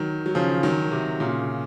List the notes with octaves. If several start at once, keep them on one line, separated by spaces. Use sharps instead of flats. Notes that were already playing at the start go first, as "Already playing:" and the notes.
Already playing: D#3 F#3
F#3
C#3 F3
D#3 F#3
C3
A#2 C#3